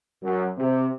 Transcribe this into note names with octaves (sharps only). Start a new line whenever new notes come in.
F#2
C3